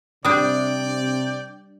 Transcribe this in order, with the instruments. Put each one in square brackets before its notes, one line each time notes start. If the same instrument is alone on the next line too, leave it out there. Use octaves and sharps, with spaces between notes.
[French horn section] C3 [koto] G3 D4 [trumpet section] D5 G5 [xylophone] D#6